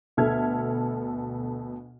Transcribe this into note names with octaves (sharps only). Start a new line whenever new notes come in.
D2 B2 A4 E5 F6 G#6